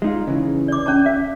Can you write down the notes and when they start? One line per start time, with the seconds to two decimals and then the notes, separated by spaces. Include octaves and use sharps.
0.02 G#3 D#4 F4
0.27 C#3 E3
0.68 D5 D6
0.86 C#4 D5 A5
1.06 E5